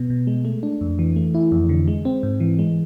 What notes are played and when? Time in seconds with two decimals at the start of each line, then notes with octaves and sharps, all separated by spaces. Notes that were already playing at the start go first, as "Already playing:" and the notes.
Already playing: B2 B3
0.10 B2
0.27 G#3
0.45 A3
0.63 D4
0.81 F2
0.99 E3
1.16 A3
1.34 E4
1.52 F2
1.69 D3
1.88 G#3
2.05 C4
2.23 G#2
2.40 E3
2.59 G#3